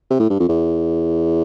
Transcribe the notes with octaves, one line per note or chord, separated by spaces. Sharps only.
C3
A2
G2
F2
E2